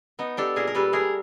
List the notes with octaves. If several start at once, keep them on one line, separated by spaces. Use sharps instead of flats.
B3 D#4
D4 G4 A4
A#2 G#4 A#4
A#4
G3 A4 B4
A3 G#4 A#4